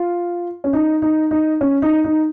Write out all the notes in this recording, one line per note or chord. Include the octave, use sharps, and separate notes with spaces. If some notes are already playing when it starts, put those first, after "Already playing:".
Already playing: F4
C#4
D#4
D#4
D#4
C#4
D#4
D#4